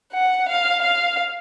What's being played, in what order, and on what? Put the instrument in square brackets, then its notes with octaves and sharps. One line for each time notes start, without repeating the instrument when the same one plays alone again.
[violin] F#5
F5
F5